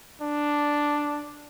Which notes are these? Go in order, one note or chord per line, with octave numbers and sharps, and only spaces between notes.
D4